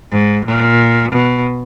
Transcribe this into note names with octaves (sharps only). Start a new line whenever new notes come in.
G#2
A#2
B2